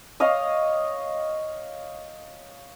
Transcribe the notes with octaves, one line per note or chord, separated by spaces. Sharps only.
C#5 D#5 F5 D#6